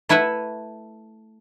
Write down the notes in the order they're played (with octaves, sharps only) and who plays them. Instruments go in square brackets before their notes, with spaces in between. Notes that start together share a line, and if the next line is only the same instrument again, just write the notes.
[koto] A3 E4 B4 E5 F#5